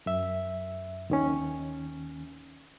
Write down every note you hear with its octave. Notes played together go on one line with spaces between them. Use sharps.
F#2 E5
D#2 D#3 C#4